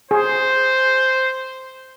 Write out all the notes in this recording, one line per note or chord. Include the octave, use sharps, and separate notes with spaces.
G#4 C5